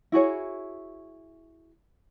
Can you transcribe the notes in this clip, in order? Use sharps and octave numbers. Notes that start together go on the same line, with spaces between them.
E4 F#4 G#4 C#5